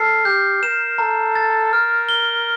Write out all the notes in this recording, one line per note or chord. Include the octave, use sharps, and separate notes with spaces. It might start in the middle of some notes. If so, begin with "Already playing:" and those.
Already playing: A4 F6 C7
G4 G6
A#4 E7
A4 A#5
A6
A#4 F6
G7